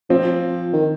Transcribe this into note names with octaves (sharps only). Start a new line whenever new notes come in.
F3 C4
D#3